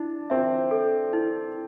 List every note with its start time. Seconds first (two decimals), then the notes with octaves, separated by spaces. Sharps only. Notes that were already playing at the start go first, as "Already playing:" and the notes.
Already playing: D4 E4
0.30 C4 E5
0.71 A4
1.13 E4